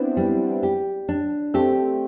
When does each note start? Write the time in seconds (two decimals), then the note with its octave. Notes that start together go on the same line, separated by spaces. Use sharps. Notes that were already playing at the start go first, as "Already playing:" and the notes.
Already playing: B3 C4 D4 E4 C5
0.17 G3
0.63 G4
1.09 D4
1.54 A3 C4 G4